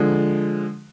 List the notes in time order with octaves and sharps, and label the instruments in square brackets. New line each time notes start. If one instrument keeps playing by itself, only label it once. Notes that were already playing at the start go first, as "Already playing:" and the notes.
Already playing: [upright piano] D3 F3 G#3